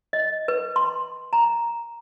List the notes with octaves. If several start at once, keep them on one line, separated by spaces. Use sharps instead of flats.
D#5
B4
C6
A#5